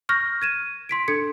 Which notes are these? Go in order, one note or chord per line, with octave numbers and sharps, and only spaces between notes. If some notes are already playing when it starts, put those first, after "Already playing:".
C#6 F6 G6 A#6
G#6 D#7 E7
C6 B6 D7
D4 A4 G#6 C#7